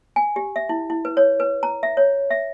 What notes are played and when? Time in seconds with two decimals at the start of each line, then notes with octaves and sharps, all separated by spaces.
0.16 G#5
0.36 G4
0.56 E5
0.69 E4
0.90 E4
1.05 B4
1.17 C#5
1.40 B4
1.63 A#5
1.83 E5
1.97 C#5
2.30 E5